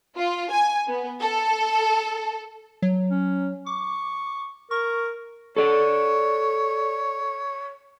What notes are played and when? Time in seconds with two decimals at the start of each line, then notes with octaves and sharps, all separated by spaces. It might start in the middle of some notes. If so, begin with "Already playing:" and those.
0.16 F4
0.51 G#5
0.87 B3
1.20 A4
2.82 F#3
3.11 C#4
3.66 C#6 D6
4.71 A#4 C#6
5.57 A4 C#5 D5